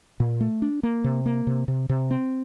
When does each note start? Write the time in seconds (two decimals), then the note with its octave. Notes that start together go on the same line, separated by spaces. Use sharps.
0.20 A#2
0.40 A3
0.62 D4
0.83 A#3
1.04 C3
1.26 A#3
1.47 C3
1.68 C3
1.89 C3
2.11 C4